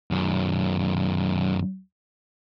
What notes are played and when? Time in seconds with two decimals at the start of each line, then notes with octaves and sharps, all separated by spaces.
0.11 F#2 D#3